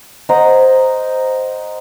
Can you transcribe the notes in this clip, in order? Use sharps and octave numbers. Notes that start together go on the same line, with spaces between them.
C5 D#5 F#5 A#5